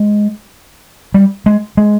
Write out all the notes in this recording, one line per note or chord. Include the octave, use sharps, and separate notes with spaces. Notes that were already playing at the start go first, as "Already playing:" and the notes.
Already playing: G#3
G3
G#3
G#3